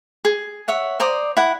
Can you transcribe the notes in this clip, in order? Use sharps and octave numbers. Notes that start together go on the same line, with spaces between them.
G#4
C#5 E5 F#5
C5 D5 A#5 D#6
E4 F#5